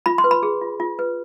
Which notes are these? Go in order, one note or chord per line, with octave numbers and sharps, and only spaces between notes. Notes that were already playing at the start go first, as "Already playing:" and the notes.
F4 B5
C6
B4
B5
G#4
F4
F4
B4